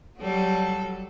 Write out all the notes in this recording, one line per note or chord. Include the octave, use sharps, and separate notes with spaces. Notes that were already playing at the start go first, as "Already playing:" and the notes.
F#3 G3 A4